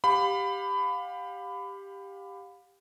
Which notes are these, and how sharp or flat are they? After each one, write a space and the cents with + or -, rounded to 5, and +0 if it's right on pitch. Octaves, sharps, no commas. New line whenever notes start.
G4 +10 F5 +30 B5 +20